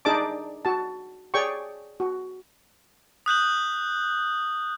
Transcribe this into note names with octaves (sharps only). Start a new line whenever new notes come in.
D4 D#4 G#4 D5 A5 D6
F#4 A5
G#4 C#5 D5 G5 C#6
F#4
D#6 F#6 G6 F#7